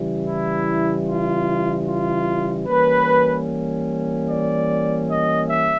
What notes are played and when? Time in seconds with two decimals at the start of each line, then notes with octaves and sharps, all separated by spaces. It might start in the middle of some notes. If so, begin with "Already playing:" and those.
Already playing: C#3 E3 G3
0.25 E4
1.06 F4
1.86 F4
2.66 E3 G3 A#3 C#4 B4
4.28 D5
5.08 D#5
5.48 E5